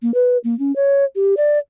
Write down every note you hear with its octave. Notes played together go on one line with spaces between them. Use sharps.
A#3
B4
A#3
C#4
C#5
G4
D5